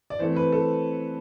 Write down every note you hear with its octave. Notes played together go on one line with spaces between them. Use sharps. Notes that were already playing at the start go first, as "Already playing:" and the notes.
D5
E3 A3 C4 C5
B4
A4